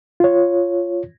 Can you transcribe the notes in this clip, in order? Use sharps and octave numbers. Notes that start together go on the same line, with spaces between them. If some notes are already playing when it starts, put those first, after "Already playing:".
F4 C#5